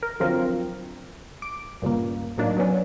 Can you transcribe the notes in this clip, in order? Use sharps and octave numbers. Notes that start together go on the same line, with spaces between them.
A#4
D3 F3 F#3 C4 F4 A#4
D6
C#2 G2 A#2 C#3 A#3
A2 F#3 A#3 D4 D#4
F#3 B3 C#4 D4